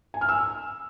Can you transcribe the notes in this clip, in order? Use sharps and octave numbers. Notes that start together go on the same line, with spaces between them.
G#5
F6
E6